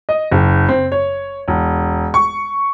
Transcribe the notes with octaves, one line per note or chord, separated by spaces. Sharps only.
D#5
F#1
C4
C#5
E1
C#6